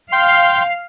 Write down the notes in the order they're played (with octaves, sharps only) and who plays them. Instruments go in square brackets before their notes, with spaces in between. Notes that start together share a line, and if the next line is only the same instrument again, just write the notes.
[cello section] F5 [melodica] G5 C6